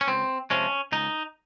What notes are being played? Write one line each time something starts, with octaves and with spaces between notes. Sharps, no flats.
C#4
C#2 C4
C3 F3 G#3 C#4
C#2 D#4